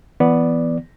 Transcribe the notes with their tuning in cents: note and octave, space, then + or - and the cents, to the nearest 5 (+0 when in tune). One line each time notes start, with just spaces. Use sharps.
E3 +20 B3 +0 D5 +0